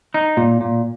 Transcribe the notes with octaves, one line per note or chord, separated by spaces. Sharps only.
D#4
A#2
A#2